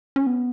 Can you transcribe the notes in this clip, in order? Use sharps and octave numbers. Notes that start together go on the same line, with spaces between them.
C#4
B3